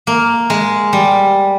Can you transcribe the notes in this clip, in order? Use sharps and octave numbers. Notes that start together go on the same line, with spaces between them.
A#3
G#3
G3